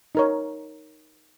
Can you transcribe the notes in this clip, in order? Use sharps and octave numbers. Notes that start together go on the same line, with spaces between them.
D#4 A#4 C#5